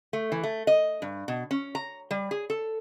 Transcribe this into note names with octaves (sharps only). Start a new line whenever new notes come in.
A3
E3
A3
D#5
G2
B2
C#4
A#5
G3
G#4
A4